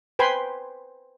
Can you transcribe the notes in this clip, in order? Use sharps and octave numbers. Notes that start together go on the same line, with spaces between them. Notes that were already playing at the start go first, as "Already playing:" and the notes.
B4 C5 G5 G#5 B5 C6